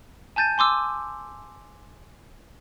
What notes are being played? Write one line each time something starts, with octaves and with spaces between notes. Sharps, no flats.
G#5 A5 G6 A6 D#7
G#5 C6 D6 E6